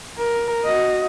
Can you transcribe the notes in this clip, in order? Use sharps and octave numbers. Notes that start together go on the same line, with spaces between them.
A#4
F#4 D#5